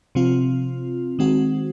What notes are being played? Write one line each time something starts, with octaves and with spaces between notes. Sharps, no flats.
C3 F3 C4 F4
D#3 G#3 C4 F#4